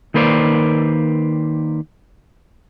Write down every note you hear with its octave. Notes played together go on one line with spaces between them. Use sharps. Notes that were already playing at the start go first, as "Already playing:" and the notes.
D#3 A#3 B4 C5 D5